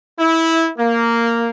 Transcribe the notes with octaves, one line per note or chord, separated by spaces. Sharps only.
E4
A#3